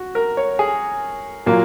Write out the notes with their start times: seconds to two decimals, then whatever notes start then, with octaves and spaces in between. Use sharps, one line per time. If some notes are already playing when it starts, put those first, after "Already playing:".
Already playing: F#4
0.15 A#4
0.37 C#5
0.59 G#4
1.46 A#2 F#3 A#3